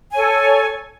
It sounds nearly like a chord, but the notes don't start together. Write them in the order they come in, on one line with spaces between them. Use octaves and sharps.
G#5 C#5 A4